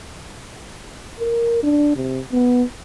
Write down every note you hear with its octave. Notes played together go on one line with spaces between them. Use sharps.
A#4
D4
C3
B3